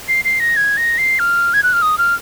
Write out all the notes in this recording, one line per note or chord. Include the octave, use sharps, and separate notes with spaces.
C7
C7
A#6
G#6
A#6
C7
F6
G#6
F#6
F6
D#6
F6